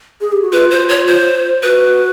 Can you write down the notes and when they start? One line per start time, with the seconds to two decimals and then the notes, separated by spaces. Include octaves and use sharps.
0.21 G#4
0.32 G4
0.42 F#4
0.52 F4 B4
0.71 C5
0.89 C#5
1.07 C5
1.63 F#4 B4